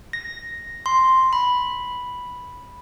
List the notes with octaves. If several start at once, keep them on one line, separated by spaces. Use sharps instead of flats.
A#6
C6
B5